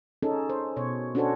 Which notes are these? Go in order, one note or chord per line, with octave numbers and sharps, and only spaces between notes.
C#4 D#4 G#4 A4
C5
B2 C#5
C#4 D4 F#4 A4 C5 C#5